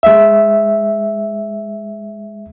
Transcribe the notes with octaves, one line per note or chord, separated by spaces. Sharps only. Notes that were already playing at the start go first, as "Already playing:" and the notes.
G#3 E5